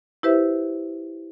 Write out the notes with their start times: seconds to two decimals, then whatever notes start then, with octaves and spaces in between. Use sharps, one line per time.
0.23 E4 G4 B4 C5 E5